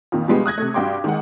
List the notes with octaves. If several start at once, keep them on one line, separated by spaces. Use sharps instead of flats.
F2 A#2 D#3
B2 F3 G3 G#3 B3 D4
D#6 F#6 G#6 A#6
C3 A3
G2 F#4 G5 C6 D6
D#3 G#3 F#5